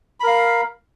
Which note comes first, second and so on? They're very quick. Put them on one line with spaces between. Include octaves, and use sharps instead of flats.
B5 A#4 F5